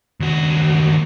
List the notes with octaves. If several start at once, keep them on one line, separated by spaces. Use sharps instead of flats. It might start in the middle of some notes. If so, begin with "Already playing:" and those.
D#2 F#4